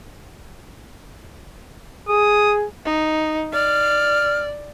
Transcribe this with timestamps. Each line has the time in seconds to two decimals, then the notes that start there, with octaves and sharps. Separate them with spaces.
2.09 G#4 D#6
2.85 D#4
3.53 D5 F6